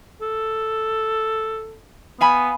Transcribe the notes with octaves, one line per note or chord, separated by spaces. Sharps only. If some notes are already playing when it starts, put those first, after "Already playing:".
A4
B3 F5 G#5 B5